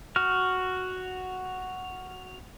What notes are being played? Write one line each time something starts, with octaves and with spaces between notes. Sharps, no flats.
F#4 F6